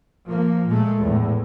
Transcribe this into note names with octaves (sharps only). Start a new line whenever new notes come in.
F3 A#3
A#2 G#3 A3
E2 A2